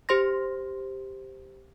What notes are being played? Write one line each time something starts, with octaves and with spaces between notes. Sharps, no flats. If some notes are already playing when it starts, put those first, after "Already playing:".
G4 C5 C6 A#6